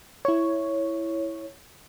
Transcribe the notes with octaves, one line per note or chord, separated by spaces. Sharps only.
E4 C#5